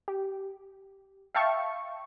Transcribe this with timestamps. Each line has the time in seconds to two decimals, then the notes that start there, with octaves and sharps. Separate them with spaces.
0.08 G4
1.34 E5 F5 G5 A5 C#6